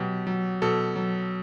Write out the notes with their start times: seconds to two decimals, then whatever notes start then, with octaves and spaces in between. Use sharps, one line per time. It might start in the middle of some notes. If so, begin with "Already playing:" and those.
Already playing: B2 F#3 G4
0.27 F#3
0.62 B2 A4
0.96 F#3